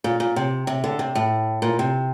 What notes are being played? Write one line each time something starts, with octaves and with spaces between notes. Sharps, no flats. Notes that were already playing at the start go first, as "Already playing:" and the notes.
A#2
A#2
C3
C3
D3
C3
A2
A#2
C3